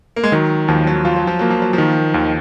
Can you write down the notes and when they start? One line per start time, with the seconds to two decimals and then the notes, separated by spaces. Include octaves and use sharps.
0.16 A#3
0.24 G#3
0.32 D#3 F#3
0.68 D#2 F3
0.87 F#3
1.05 F3 F4
1.17 F#3
1.27 F3
1.39 F#3 A#3
1.50 F3
1.62 F#3
1.73 D#3 F3
2.14 D#2